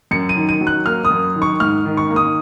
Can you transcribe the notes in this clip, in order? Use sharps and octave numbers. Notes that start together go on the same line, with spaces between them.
F#2 C#7
D#7
D#3
D#7
F#3
F#6
A#3 F6
D#6
F#2
D#3
C#6
G#2 F6
D#3
C#6
A#3
D#6